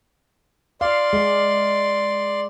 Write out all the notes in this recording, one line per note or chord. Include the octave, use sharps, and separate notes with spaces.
D5 F5 C6
G#3